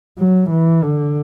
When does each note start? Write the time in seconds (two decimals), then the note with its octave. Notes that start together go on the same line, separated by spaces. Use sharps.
0.18 F#3
0.50 E3
0.83 D3